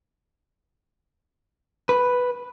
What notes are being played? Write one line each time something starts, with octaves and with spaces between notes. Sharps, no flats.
B4